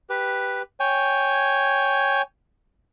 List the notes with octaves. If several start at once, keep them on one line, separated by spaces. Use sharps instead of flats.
G4 B4
C#5 G5 G#5